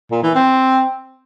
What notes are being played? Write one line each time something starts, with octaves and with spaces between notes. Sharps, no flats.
A#2
E3
C4